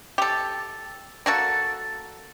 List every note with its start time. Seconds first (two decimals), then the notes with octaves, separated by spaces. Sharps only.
0.18 G4 A4
1.26 A#3 F#4 A4